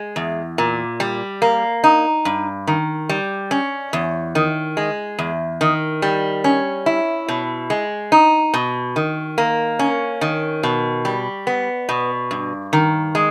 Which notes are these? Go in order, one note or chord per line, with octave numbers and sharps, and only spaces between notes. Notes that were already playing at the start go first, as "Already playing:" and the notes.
Already playing: G#3
E2
A#2
G3
A#3
D#4
G2
D#3
G3
C#4
E2
D#3
G#3
E2
D#3
G3
C#4
E4
B2
G#3
D#4
B2
D#3
A#3
C#4
D#3
B2
G3
B3
B2
G2
D#3
G#3